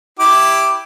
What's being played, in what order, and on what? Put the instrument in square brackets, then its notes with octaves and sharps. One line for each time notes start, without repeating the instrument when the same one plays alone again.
[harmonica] E4 G4 D6